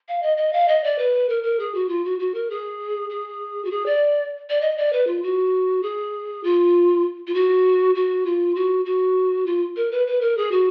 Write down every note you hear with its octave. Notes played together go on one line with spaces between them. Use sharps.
F5
D#5
D#5
F5
D#5
D5
B4
A#4
A#4
G#4
F#4
F4
F#4
F#4
A#4
G#4
G#4
F#4
G#4
D5
D5
D#5
D5
B4
F4
F#4
G#4
F4
F4
F#4
F#4
F4
F#4
F#4
F4
A#4
B4
B4
A#4
G#4
F#4